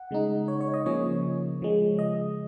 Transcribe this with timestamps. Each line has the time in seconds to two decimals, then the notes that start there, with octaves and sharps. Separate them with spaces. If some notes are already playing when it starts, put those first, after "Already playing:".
Already playing: F#5
0.11 C#3 G#3 D#4
0.48 C#5
0.61 C#5
0.74 D#5
0.86 C#3 F3 A#3 C#4 C#5
1.62 C#3 F3 G#3
1.99 D#5